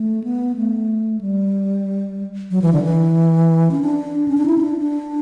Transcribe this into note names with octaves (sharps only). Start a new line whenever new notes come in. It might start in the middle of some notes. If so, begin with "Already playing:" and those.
Already playing: A3
B3
A3
G3
F#3
E3
D3
E3
C#4
D4
C#4
D4
E4
C#4
D4
D4